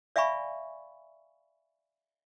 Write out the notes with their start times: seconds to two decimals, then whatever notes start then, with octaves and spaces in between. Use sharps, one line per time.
0.16 D5 E5 F5 G#5 B5 C#6